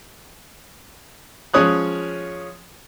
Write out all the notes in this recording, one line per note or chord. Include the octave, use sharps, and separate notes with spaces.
F3 G#3 C#4 C#5 D#6 F#6